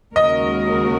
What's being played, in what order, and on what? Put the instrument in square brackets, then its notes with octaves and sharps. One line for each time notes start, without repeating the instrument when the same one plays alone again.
[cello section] D#2 C#3 G#3 F#4 A#4 [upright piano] D#5